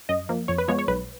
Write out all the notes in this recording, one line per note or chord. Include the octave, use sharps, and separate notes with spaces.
F#2 D#5
F3 A#3
F2 C#5
B4
F3 G#3 B3 C#5
C#5
B1 B4